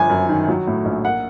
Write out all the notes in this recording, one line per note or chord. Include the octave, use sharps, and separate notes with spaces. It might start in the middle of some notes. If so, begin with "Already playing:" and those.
Already playing: G1 F3 G#5
F#2
D#3
F#3
A2
A#1
A#3 F#5